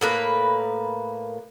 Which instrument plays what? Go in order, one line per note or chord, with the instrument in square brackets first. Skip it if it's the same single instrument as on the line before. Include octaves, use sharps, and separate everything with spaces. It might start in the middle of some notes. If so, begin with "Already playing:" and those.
[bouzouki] A2 A#3 B4